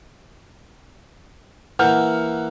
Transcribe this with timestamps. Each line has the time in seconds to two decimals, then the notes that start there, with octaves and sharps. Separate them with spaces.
1.79 E3 A#3 F#5 F6 G6